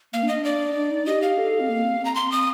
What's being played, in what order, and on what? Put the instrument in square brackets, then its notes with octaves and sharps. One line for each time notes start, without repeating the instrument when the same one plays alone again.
[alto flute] A#3 [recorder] F5
[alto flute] D4
[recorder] D#5
[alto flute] D4
[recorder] D5
[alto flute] D4
D#4
[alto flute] G4 [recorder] D#5
[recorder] F5
[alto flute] A4
C4
A#3
C4
[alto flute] C4 [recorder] A#5
[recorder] C6
D#6